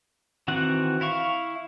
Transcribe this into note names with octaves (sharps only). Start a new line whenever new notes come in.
D#3 E3 C4 F#4 F#5
E4 F5 C#6